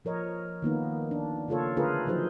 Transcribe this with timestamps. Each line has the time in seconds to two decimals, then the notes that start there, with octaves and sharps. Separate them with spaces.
0.05 F3 A#4 C#5 D#5
0.62 D#3 A#3 B3 D#4
1.11 D4
1.48 C#3 A#3 F4 A4 C#5
1.77 D3 A3 F4 G#4 A#4 B4
2.06 F3 F#3 D#4 G#4 C5